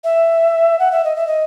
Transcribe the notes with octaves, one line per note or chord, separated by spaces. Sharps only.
E5
F#5
E5
D#5
E5
D#5